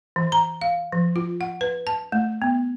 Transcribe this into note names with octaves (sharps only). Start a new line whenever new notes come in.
E3
A#5
F5
F3
F4
F#5
B4
A5
A3
B3